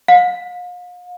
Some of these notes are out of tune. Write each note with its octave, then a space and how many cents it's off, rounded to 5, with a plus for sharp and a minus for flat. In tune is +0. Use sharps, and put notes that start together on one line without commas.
F5 +40